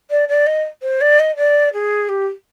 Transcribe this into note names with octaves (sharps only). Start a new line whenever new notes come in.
D5
D5
D#5
C5
D5
D#5
D5
G#4
G4